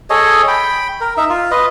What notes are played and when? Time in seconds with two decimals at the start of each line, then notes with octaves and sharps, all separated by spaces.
0.10 G#4 A4 C#5 D#5
0.48 G5 B5
1.01 A#4
1.17 D#4 E5
1.29 F4
1.51 B4 D#5